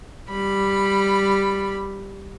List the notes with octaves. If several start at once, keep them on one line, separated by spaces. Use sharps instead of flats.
G3 B5